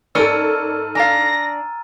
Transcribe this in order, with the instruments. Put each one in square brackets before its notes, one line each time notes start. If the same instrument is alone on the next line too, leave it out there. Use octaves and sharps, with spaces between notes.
[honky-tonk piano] G#2 A4 [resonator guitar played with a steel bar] C#4 A#4 D5 [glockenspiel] E6 F6 D#7
[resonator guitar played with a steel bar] D4 F5 [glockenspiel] G#5 A#5 A6 [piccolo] A#6